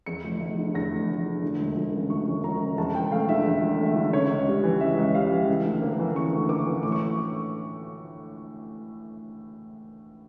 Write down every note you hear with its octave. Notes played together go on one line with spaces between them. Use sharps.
E2 C#7
F1
F1
D3
E2 A#6
F1
F1
D3
D2
E1
E1
C#3
D2 C#6
E1
E1 A#5
C#3
E2 A5
E1 G5
A3 F5
D3 E5
E2
E1
A3
D3
C#3 C#5
C#2
G3
E3
C#3 E5
C#2
G3 F5
E3
C#3
D2
A#3
E3
C#3 C#6
D2
A#3 D6
E3
A2 D6
C#6